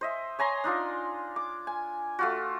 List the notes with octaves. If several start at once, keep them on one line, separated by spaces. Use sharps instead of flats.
C5 D#5 E5
C#5 G#5 A#5 C6
D4 D#4 F4 D5
D6
G#5
A3 F4 F#4